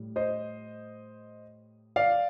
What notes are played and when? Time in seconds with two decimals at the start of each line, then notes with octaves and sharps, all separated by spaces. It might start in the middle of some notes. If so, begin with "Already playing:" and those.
Already playing: A2 G3
0.16 C5 D#5
1.96 D5 F5